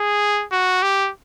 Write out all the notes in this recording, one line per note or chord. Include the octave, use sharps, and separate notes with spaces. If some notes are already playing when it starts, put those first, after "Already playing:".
Already playing: G#4
F#4
G4